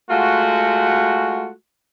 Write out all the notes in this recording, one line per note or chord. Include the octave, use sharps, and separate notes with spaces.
G#3 A3 F4 F#4